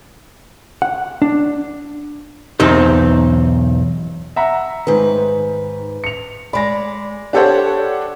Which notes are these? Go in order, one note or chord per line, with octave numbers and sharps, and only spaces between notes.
F#5
D4
B1 E2 C4 D#4 C5
E5 F#5 A#5
G#2 D#3 B4
C#7 F7
G#3 D5 B5 A#6
D4 G4 A4 C5 C#5 F#5